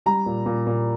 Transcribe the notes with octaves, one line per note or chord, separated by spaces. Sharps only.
G3 A#5
A#2
A#2
A#2